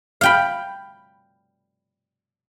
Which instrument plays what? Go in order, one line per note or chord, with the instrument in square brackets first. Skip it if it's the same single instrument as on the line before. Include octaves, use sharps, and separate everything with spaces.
[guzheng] F5 G5 B5